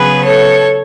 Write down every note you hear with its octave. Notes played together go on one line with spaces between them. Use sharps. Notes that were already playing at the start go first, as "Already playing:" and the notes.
Already playing: C#3 F#3 B3 G#4 B4
A4 C#5